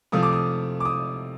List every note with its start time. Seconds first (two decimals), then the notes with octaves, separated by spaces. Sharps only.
0.12 C3 F3 A3 D#6
0.23 D6
0.33 D#6
0.80 D6
0.85 D#6